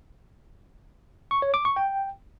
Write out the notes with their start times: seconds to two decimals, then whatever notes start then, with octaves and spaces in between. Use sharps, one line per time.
1.31 C#6
1.42 C#5
1.54 D6
1.65 C#6
1.76 G5